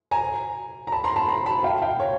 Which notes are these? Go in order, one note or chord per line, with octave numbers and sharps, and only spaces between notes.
G#5 A#5
A#5
A5 B5
A#5 C6
A5 B5
A#5 C6
A5 B5
F5 G5
F5 G5
C#5